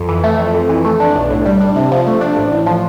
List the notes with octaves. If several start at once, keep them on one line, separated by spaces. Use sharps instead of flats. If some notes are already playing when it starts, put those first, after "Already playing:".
Already playing: F2
E3
A3
F2
F2
E3
A3
D4
B1
A2
G3
D4
C3
F3
A3
D4
A1
A2
F3